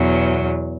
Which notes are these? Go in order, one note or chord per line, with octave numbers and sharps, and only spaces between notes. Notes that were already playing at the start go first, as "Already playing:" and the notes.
Already playing: E2 B2 F#3